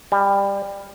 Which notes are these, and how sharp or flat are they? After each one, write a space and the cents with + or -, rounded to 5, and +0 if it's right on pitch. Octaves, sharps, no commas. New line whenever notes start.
G3 +20